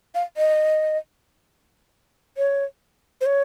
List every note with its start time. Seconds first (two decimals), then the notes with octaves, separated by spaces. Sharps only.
0.15 F5
0.37 D#5
2.37 C#5
3.21 C5
3.26 C#5